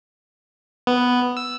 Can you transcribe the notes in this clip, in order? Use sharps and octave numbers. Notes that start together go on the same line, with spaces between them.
B3
E6